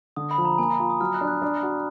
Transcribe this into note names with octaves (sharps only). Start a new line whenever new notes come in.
D3 D#6
B5
F3
A#5
A#3 G#5
A#5
F4
D#6
F#3 F6
F#6
D4
F#6
D4
F#4